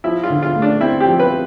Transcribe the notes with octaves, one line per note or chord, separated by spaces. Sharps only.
F3 E4
F4
D3
F4
A3
D4
C4 E4
G4
F3
B4